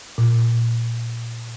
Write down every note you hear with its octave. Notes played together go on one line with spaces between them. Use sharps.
A#2